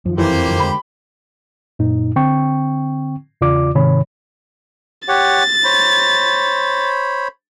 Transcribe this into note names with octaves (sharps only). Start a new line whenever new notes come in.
F#2 D#3 F3
F2 E3 A#3 G4 C5
F#2 D3 D#3
D3 G#3 B5
F#2 A#2 D#4
D3 C4 G5 C#6
E2 C#3 F4 D5 D6
G#2 C3 D#3 C#5 B5
G4 C#5 F#5 A6
C5 C#5 B5